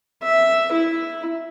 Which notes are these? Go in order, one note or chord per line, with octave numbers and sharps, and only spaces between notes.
E5
E4